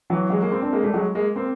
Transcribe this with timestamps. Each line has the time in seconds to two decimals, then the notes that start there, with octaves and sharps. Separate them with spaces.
0.10 E3 F#3
0.30 F#3 G#3
0.41 G#3 A#3
0.52 A#3 C4
0.62 C4 D4
0.72 G#3 A#3
0.83 G3 A3
0.94 F#3 G#3
1.15 G#3 A#3
1.36 A#3 C4